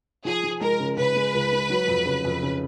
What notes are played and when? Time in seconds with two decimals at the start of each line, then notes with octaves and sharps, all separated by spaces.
0.25 F3 G#4
0.44 F3
0.61 G#3 A#4
0.80 C#3
0.97 C#3 B4
1.16 G#3
1.34 C#2
1.53 G#3
1.70 F#3
1.88 F2
2.06 C#3
2.25 F2
2.43 C#3